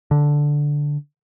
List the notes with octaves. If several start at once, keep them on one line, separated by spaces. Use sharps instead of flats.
D3